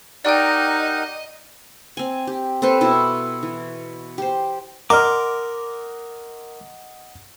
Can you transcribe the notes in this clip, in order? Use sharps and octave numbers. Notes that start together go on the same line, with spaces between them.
D#4 G4 A#4 D5 D#5 F#5 G5
C4 G#5
G4
C4 A4 B4 C5
B2 E4 A5
E3
G4 C5
A#4 D#5 F#5 A#5 C6 D6 F6